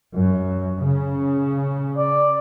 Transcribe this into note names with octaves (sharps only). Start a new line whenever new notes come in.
F#2
C#3
D5